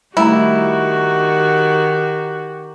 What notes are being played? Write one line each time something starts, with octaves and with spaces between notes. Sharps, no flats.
D#3 G3 A3 E4 F#4 G4 A#5